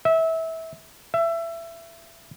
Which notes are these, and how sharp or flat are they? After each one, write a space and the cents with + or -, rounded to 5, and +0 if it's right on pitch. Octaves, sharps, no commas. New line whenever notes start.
E5 -25
E5 +20